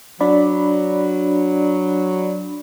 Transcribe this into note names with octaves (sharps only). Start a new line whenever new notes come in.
F#3 D4 D5 B5